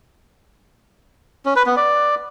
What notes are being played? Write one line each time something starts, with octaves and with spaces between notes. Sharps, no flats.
C#4
B4
B3
D5